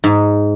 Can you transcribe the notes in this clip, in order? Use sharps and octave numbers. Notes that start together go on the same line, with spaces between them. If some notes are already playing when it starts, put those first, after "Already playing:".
G#2